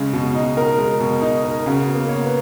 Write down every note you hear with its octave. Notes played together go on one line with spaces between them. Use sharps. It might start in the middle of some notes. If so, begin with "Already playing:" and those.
Already playing: C#3 G#3
B2
D#4
A#4
G#3
B2
D#4
A#4
C#3 F#4
B3
A#3
C#5
B3